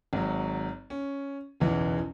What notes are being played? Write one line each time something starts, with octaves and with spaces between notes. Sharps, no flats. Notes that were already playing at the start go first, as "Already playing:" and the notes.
G#1 G#2 F#3
C#4
F#1 B1 E2 E3